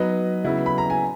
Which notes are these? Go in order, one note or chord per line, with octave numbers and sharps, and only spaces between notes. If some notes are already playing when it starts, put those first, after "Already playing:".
Already playing: F#3 B3 D#4 B4 D#5
C#3 F#3 B3 E4
B5
A#5
G#5